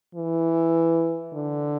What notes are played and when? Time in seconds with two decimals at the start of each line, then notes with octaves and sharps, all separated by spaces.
0.15 E3
1.34 D3